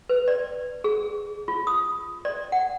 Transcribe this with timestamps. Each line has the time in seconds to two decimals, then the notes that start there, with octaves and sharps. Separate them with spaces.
0.09 B4
0.28 D5
0.84 G#4
1.48 F4
1.67 D#6
2.25 D5
2.52 F#5